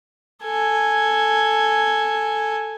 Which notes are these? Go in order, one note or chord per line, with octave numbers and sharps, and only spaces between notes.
A4 G#5